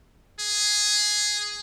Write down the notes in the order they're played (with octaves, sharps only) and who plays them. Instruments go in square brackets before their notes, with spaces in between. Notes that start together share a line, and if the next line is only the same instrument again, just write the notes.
[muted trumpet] G#4